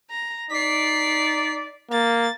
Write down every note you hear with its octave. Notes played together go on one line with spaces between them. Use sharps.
A#5
D#4 D5 B6 C7
A#3 A6